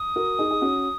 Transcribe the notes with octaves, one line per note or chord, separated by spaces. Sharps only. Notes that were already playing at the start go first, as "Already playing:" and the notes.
Already playing: D#6
F#4 A#4
D#4 G#4
G#4
C#4 F#4